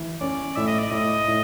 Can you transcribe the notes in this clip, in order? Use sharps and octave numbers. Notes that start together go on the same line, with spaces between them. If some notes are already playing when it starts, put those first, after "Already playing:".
Already playing: E3
C#4 D5
A2 E5
D#5
D5
A2 D#5
A2